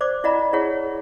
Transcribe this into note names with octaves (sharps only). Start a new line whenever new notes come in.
C5 D5 D6
E4 D5 D#5 F#5 A#5 B5
E4 G#4 C#5 F#5